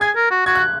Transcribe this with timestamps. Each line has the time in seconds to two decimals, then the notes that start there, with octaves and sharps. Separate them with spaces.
0.01 G#4 G#6
0.16 A#4
0.31 F#4
0.46 F#4 G#6
0.55 F#6